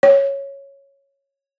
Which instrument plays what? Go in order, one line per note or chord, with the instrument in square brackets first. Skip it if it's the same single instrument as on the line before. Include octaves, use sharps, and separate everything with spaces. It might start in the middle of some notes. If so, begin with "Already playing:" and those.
[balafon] C#5